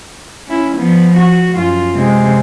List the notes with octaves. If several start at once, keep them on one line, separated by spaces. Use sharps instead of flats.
C#4 E4
F3 B3
F#4
F#2 F4
C3 G#3